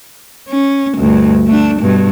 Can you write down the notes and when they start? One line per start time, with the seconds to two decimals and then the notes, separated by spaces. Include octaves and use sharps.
0.49 C#4
0.98 D2 G2
1.46 A3 D4
1.80 G2 B2